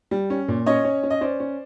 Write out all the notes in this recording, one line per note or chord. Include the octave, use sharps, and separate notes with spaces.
G3
C#4
A#2
C#4 C#5 D#5
C#4
C#4
D#5
C#4 C5 D5
C#4